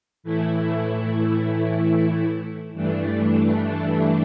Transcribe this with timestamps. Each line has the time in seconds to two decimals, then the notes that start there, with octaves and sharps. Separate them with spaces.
0.24 A2 E3 A3 E4
2.74 G2 E3 A3 D4